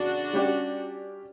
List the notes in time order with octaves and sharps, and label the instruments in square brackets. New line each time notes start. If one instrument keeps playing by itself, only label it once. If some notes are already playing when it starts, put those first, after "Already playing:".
Already playing: [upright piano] E2 C#3 [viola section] D4 F#4
[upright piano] G3 C#4 G4 D5